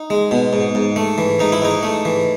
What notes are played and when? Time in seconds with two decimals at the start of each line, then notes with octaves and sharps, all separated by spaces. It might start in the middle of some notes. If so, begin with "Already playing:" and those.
Already playing: D#4
0.10 G#3
0.31 B2
0.53 G#2
0.75 G#2
0.96 A3
1.18 E3
1.40 G#2 D#4
1.52 E4
1.62 G#2 D#4
1.83 A3
2.05 E3